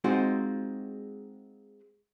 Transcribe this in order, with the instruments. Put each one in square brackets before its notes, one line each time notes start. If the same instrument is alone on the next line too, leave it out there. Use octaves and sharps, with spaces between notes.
[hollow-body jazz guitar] G#3 C4 D#4 F4 F#4